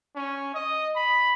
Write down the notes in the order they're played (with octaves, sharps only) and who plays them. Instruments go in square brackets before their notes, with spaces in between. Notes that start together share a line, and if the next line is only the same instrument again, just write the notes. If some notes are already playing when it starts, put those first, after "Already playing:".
[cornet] C#4
D#5
B5